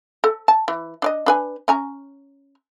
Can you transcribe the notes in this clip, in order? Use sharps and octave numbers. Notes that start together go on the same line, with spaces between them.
A4
A5
E3
D4 D5 D#5
D4 B4 G#5
C#4 G#5 A#5